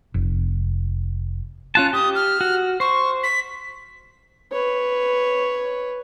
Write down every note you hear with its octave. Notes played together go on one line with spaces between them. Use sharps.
F1
C#4 F4 A5 F#6
G4 D#6
F6
F#4
C5 C#6
B6
B4 C#5